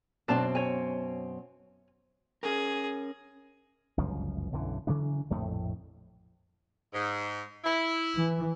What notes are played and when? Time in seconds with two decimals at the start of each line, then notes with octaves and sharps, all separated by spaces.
0.28 F#2 B2 C4 D4 A5
0.55 C#5 G#5
2.43 C#4 G#4 A#4
3.97 G1 C#2 F#2 F3
4.52 B1 F#2 D3 E3
4.87 C#3 E3 F#3 D4
5.30 A#1 F2 A2 A3
6.94 G#2
7.65 E4
8.16 E3